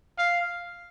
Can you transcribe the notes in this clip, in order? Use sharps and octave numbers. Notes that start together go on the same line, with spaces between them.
F5